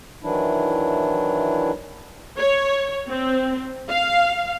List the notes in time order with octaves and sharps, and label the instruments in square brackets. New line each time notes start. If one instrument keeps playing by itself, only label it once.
[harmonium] D#3 E3 F#3 D4 E4
[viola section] C#5
C4
F5